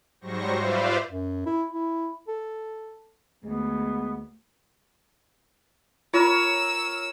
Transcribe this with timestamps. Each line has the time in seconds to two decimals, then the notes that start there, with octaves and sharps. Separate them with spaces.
0.21 G#2 F#3 G3 C5 C#6 A#6
0.55 F4 B4 C5 D5 E5 F5
1.09 F#2
1.46 E4
1.73 E4
2.28 A4
3.44 D2 G#3 B3
6.14 F4 A#4 C#5 E6